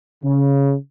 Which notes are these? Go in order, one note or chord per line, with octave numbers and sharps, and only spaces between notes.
C#3